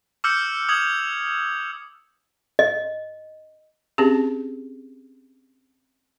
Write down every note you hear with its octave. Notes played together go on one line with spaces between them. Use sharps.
D6 E6 F6 G6 C#7
D#6 G#6 F#7
D#5
C4 C#4 G4 G#4